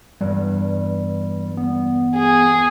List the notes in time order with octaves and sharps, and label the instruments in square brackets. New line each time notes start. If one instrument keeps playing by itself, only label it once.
[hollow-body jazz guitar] E2 G2 [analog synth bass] G3
[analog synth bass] B3
[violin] G#4